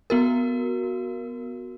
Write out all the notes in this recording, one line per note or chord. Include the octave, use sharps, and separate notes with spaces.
B3 F#4 A#4